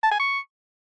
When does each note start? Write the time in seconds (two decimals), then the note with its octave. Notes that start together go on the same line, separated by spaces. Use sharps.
0.03 A5
0.11 G#5
0.20 C#6